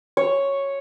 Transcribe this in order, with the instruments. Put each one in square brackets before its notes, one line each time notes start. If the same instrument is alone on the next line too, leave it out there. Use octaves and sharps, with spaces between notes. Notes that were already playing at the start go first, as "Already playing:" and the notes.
[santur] C#5